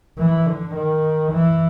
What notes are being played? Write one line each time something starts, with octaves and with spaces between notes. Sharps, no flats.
E3
D3
D#3
E3